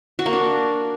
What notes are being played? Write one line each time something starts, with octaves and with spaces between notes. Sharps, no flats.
F#4
A#3
D4